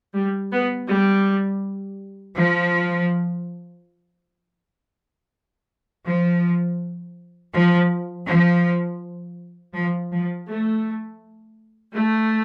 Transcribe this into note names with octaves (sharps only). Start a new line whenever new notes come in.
G3
B3
G3
F3
F3
F3
F3
F3
F3
A3
A3